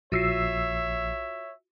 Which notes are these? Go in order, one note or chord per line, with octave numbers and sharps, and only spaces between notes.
A#1 F4 F#4 C#5 E5 E6 C7